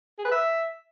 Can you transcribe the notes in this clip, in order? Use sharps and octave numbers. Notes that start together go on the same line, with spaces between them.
G#4
B4
E5